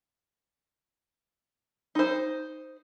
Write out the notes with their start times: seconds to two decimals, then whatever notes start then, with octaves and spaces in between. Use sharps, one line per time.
1.95 D#4 C5